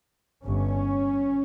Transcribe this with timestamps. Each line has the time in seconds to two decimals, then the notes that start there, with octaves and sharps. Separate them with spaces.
0.44 G1 G2 C#4